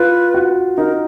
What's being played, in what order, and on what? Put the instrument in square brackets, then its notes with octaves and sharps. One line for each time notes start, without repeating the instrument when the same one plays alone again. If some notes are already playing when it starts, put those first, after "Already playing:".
Already playing: [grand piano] F4 [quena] B4
[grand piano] F#4
[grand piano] D#4 [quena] A#4